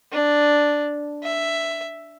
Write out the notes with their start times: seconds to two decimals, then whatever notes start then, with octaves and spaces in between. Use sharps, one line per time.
0.12 D4
1.23 E5